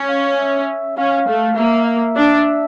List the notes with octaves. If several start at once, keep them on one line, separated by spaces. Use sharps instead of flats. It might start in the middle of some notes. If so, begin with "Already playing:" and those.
Already playing: C#4
F5
E5
C#4 F5
A3
A#3 E5
E5
D4